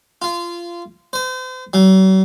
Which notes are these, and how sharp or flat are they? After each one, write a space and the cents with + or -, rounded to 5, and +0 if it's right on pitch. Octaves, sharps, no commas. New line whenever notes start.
F4 -20
C5 -40
F#3 +45